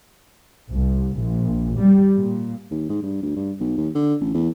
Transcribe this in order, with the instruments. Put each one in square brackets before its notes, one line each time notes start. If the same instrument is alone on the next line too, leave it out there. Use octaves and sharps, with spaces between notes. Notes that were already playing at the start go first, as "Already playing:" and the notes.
[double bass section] C2
A#1
G3
A#2
[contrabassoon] D#2
G#2
G2
D2
G2
B1
D#2
D3
A1
E2